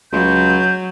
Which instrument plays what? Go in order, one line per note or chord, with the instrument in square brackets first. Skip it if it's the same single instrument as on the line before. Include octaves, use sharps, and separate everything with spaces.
[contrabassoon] C#2 [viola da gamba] F#3 [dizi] G6